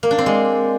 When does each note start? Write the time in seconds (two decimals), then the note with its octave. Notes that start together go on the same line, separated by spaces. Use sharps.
0.03 A#3
0.11 D4
0.18 C4
0.26 G#3